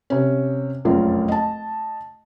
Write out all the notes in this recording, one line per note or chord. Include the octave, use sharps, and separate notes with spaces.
C3 C#4
F1 A#1 F#2 C#4 F4 A#4
D#5 A5